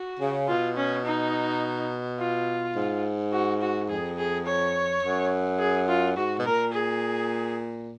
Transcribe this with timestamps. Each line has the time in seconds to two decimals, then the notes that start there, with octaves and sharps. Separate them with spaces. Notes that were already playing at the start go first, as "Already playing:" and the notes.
Already playing: F#4
0.20 C#3
0.48 B2 F4
0.76 C#4
1.05 D#4
2.19 F4
2.75 G#2
3.32 F#4
3.61 F#4
3.89 F2 G#4
4.17 G#4
4.46 C#5
5.02 F#2
5.59 G#4
5.88 F4
6.16 G#2 F#4
6.38 B2
6.45 A#2 A#4
6.73 G#4